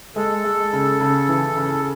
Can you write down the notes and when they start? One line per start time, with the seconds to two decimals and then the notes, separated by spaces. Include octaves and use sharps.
0.16 G#3 A4
0.44 G#3
0.73 C#3
1.00 C#3
1.28 E3
1.56 C#3